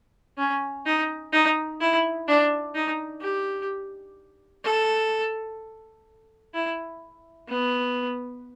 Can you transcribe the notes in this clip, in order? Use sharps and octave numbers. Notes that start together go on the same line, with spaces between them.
C#4
D#4
D#4
E4
D4
D#4
G4
A4
E4
B3